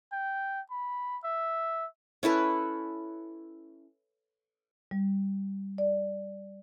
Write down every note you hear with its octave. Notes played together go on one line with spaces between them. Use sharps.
G5
B5
E5
C#4 E4 A4 B4
G3
D5